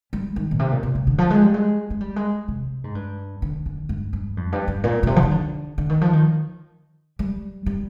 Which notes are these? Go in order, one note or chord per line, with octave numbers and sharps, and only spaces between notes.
G3
D#3
A#2
C3
A#2
C3
C3
D3
F3
G#3
G3
G#3
G#3
G3
G#3
C3
G#2
G2
D3
D3
G2
G2
F2
G2
G2
A#2
A#2
C3
F3
D#3
D3
D3
D#3
F3
D#3
G3
G3